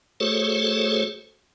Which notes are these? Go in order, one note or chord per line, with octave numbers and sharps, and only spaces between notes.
A3 F#4 G#4 A4 C5 C#5